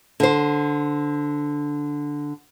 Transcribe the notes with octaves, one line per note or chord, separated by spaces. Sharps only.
D3 C5